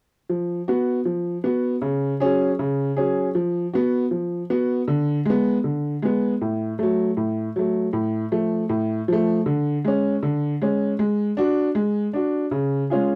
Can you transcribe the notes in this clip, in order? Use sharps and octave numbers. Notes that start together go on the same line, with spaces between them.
F3
B3 F#4
F3
B3 F#4
C#3
F#3 C#4 G#4
C#3
F#3 C#4 G#4
F3
B3 F#4
F3
B3 F#4
D3
G#3 B3
D3
G#3 B3
A2
F#3 A3
A2
F#3 A3
A2
F3 A3
A2
F3 A3
D3
G#3 C#4
D3
G#3 C#4
G#3
D4 F#4
G#3
D4 F#4
C#3
G#3 C#4 F4 G#4